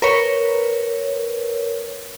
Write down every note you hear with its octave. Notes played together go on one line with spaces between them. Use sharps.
A#4 B4 C#5